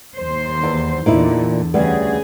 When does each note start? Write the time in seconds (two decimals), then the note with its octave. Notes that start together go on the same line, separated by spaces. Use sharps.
0.16 D#2 C5
0.63 E2
1.06 E2 A#2 D3 D#4 E4
1.74 D2 C#3 E3 G3 B3 G#4